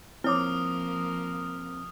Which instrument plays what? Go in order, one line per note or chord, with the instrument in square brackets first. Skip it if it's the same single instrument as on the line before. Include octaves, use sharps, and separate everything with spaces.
[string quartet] F3 A#3 [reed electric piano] C4 [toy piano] E4 C#5 D6 [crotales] D#6 F6